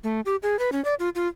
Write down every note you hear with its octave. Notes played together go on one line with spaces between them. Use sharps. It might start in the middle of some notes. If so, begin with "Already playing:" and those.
A3
G4
G#4
B4
C#4
D5
F4
F4